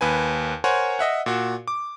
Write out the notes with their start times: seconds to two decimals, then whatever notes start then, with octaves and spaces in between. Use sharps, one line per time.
0.01 D#2 B4 G#5
0.64 A#4 C5 C#5 F#5 G#5
0.99 D#5 E5 F#5
1.26 A#2 F#4
1.68 D6